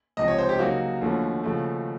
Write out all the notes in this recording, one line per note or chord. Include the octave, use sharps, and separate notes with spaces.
C#2 C3 F3 D#5
C#5
C5
G4
C#3 F#3 A#3 D#4 F#4
D#2 D3 F3 A3 C#4
D#2 C#3 F3 A3